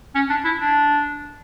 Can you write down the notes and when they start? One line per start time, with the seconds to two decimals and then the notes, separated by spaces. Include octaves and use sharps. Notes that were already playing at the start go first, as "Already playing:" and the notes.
0.15 C#4
0.30 D4
0.45 E4
0.60 D4